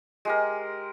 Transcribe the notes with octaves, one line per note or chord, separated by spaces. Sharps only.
G#3 G4 A#4